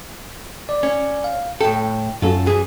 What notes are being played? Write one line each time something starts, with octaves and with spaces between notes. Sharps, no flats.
D5
C#4
F5
A2 A4 G5
F#2 C#4 F4 F#4 A4
E3 G#4